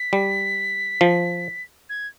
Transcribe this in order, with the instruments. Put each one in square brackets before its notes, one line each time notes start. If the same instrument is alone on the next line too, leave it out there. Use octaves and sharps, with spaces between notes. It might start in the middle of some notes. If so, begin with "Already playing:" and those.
Already playing: [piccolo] B6
[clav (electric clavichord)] G3
F3
[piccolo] G#6